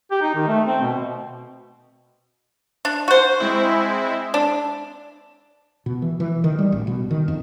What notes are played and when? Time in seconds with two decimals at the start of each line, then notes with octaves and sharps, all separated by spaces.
0.11 G4
0.22 D#4
0.35 D#3
0.47 A3
0.66 C4
0.81 B2
2.85 D4
3.08 F#4 C5
3.40 G#3 C4 E4
4.34 D4
5.86 B2
6.02 E3
6.20 E3
6.44 D#3
6.59 G3
6.72 A1
6.87 B2
7.11 D#3
7.28 F2